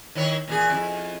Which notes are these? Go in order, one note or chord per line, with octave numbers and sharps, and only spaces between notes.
D#3 E4 C#5
A#2 E3 G#4
F2 E4